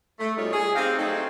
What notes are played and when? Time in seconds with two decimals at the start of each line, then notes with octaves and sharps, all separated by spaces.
0.19 A3
0.37 B2 G3 G#3 D#4 F4 C#5
0.53 G#4
0.76 C4 D#4 G4 G#4 F5
0.99 F#3 A3 C4 D#4